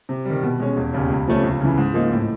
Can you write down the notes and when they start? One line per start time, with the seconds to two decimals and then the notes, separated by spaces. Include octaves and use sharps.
0.09 C3
0.25 D#3 G3
0.43 B2
0.60 G#3 C#4
0.77 E1
0.93 D#2 C#3
1.10 C#2
1.27 C3 F3 A3 C#4
1.44 C#2
1.61 C#3 E3
1.77 G#2
1.94 F3 A#3 D#4
2.12 A2